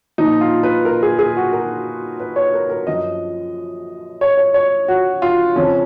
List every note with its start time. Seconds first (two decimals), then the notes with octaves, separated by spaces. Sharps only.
0.18 A#2 F3 D#4
0.41 F4
0.63 B4
0.85 A#4
1.03 G#4
1.19 G#4
1.37 F#4
1.53 A#4
2.20 B4
2.36 C#5
2.54 A#4
2.70 A#4
2.87 F#2 F3 D#5
4.21 C#5
4.37 C#5
4.54 C#5
4.88 F#4
5.22 F4
5.56 F2 C#3 F3 C#4